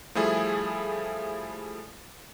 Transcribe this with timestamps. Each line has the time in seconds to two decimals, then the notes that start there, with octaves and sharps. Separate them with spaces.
0.15 F3 G3 A3 E4 G#4